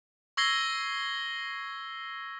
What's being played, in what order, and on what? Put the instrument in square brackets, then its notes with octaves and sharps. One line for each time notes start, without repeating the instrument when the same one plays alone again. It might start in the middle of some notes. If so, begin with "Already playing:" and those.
[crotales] C#6 E6 G#6 A#6 C7 G7